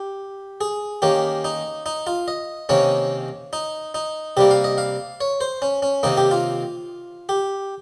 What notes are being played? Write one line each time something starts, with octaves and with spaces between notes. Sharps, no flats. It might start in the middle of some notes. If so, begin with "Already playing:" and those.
Already playing: G4
G#4
D#3 A#3 C#4 G4
D#4
D#4
F4
D#5
C3 D#3 A#3 C#4 C#5
D#4
D#4
C3 G3 A#3 G4
F5
D#5
F5
C#5
C5
C#4
C#4
C3 D#3 A#3 D#4
G4
F4
G4